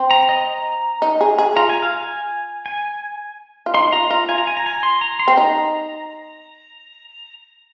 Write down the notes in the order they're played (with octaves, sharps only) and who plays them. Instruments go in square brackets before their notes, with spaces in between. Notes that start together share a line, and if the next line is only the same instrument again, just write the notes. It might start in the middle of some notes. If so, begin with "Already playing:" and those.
Already playing: [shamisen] C4
[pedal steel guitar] A#5
D#5
A#5
[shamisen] D#4
G#4
G#4
[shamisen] F4 [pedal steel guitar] A#5
[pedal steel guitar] G#5
F5
G#5
G#5
[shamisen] F4
[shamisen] D#4 [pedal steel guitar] C6
[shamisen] F4 [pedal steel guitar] A#5
[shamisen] F4 [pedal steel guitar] A#5
[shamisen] F4 [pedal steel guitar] G#5
[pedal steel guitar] A#5
G#5
A#5
G#5
C6
A#5
C6
[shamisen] C4
[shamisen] D#4 [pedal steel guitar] A#5